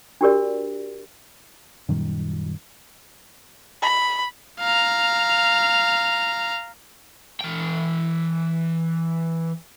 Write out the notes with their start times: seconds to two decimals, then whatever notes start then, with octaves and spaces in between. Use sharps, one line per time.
0.21 D4 F#4 G4 A#4 D5
1.89 F#2 A#2 D#3 G3
3.82 B5
4.60 F5 A#5
7.40 E3 G5